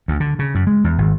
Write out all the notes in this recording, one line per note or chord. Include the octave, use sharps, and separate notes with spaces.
D2
D3
C#3
F#2
G#3
E2
G#1